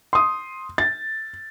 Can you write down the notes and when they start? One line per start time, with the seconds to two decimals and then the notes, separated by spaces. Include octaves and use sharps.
0.13 C6 D#6
0.78 A6